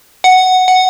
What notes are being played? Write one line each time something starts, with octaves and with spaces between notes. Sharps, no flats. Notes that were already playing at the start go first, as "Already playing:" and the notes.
F#5
F#5